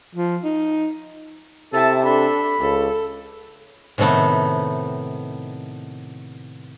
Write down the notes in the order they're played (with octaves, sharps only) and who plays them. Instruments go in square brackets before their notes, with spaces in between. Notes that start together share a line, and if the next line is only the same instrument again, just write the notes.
[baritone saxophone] F3
D#4
[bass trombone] C3 [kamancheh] E4 A5 [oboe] A4
[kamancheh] D4 A4 [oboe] B5
[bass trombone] C#2 [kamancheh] A4
[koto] A2 C3 D#3 A3 B3